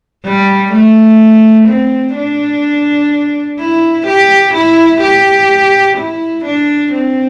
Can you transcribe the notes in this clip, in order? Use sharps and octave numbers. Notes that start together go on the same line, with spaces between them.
G3
A3
C4
D4
E4
G4
E4
G4
E4
D4
C4